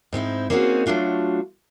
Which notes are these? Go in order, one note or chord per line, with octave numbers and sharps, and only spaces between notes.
G#2 C4 D#4 E4
A#3 C4 C#4 D#4 F#4 G#4
F#3 A3 D4 F4 F#4